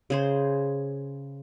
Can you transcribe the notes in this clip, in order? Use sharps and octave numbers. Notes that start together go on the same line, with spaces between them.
C#3 G#4 C5